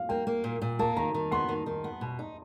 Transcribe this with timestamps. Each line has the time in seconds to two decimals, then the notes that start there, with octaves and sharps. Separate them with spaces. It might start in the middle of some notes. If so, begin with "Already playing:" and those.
Already playing: F5
0.09 A#3 G5
0.27 A#3
0.44 A#2
0.62 A#2
0.79 A#3 A5
0.97 D#3 A#5
1.14 D#3
1.31 B3 C6
1.49 D#3
1.66 D#3
1.84 B3
2.01 B2
2.19 D#4